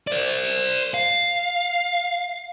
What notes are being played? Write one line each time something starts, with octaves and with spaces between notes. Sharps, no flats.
C5 D5
F5